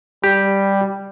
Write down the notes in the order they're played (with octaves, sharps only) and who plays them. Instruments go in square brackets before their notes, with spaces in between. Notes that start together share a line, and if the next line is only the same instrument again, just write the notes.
[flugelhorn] G3 [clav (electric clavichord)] G4